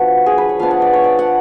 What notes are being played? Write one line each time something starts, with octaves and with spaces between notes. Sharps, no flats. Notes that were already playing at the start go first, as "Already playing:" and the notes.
Already playing: F3 B3 D4 F#4
G#4
B4
C#5
F3 B3 D4 F5
F#5
D5
C#5
D5
F#5